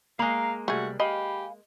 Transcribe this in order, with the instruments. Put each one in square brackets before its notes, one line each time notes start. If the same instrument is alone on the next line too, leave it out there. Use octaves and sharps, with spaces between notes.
[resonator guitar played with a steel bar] G#3 A#3 [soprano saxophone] F5 [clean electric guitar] A#5
[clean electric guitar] C2 G3 [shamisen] A3 G#4 [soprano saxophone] F#4
[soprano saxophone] G4 [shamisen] D#5 [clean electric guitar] F5 G#5 B5